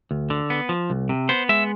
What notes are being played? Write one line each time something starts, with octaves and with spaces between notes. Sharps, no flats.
D2
D3
B3
F3
C2
C3
B3 C5
G#3 E5